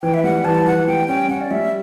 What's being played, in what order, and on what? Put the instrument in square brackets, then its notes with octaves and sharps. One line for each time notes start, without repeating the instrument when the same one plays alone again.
[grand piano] E3 [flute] G5
[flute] E5
[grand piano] G3 [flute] F#5
[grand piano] E3 [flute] A5
[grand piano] E3 [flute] F#5
[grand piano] G3 [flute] G5
[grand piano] C#4 [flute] G5
[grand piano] C#4 [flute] F#5
[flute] D5
[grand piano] G3 [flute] E5